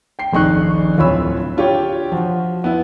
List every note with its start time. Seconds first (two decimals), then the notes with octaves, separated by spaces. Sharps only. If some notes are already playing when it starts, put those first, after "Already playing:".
0.19 G5 C7
0.32 D#1 A#1 D#4 C#6 F#6
0.98 D1 D2 F4 C#5 B5 E6
1.57 D4 F4 G4 C#5 G5
2.12 F3 F#4
2.64 B3 E4